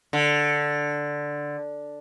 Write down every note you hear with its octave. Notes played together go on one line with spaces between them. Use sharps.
D3